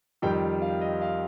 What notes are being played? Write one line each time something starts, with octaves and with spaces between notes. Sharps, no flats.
F2 D#3 G3 G5
F5
D#5
F5